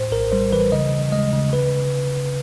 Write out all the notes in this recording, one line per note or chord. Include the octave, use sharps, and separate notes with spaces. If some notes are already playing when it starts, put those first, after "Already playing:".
Already playing: A2 C5
A#1 A#4
G3 C5
E3 B4
C#3 D#5
C#3
G#3 D#5
C#3
B4